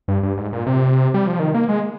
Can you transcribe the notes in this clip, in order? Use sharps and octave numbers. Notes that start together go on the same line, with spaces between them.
G2
G2
G#2
A#2
C3
G3
F3
D#3
A#3
G#3